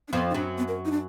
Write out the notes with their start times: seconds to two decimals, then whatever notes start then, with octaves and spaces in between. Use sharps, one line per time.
0.08 D4
0.12 F2 F3 B3
0.30 D#4
0.34 F#2 F#3 D4
0.58 B3
0.68 A#4
0.85 D#4
0.91 D4